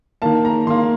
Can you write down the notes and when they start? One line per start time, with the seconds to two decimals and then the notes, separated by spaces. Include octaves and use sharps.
0.22 D#3 A#3 A5
0.45 A#5
0.67 D#3 A#3 C6